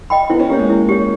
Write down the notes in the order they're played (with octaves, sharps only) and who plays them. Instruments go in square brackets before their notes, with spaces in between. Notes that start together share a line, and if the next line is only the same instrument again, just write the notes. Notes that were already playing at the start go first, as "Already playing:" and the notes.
[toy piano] D#5 G5 B5
[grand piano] B3 [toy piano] E4
[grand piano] C#4
[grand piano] A#3 [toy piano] G4
[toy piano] C#5
[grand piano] G#3
[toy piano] E4
G4 C#5